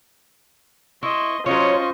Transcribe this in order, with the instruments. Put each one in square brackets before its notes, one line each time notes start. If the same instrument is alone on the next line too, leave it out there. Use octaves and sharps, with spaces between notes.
[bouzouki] E4 [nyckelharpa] D#5 C6 [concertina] C#6
[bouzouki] F#3 C#5 [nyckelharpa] C#4 D#5 [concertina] F4 C#6 [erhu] C5